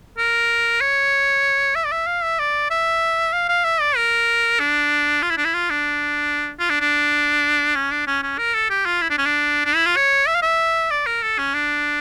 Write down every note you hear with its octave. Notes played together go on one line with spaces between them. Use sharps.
A#4
C#5
E5
D5
E5
F5
E5
D5
E5
F5
F5
E5
D5
A#4
D4
F4
E4
D4
E4
F4
D4
F4
D4
D4
C#4
D4
C#4
C#4
A#4
A4
G4
F4
E4
D4
C#4
D4
D4
E4
F4
C#5
E5
F5
E5
D5
A#4
A4
C#4
D4